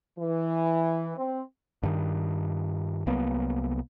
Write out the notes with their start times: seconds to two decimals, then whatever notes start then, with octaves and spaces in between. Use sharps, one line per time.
0.18 E3
1.17 C4
1.83 G2 D#3
3.07 C2 F#3 A#3 B3